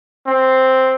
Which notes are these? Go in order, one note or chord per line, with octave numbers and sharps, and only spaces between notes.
C4